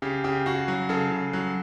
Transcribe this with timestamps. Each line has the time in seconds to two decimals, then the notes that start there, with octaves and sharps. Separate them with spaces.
0.02 C#3 G4
0.24 C#3 G4
0.46 C#3 F#4
0.68 F#3
0.89 C#3 A4
1.11 C#3
1.33 F#3